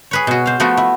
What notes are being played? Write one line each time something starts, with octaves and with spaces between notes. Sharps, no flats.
G#4 B4 C#5
B2 F#4
C5 F5
F3 A3 B3 F#4
E4